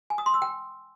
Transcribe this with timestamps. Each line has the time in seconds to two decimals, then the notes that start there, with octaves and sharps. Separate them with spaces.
0.10 G#5
0.18 D#6
0.26 C6
0.34 E6
0.42 G5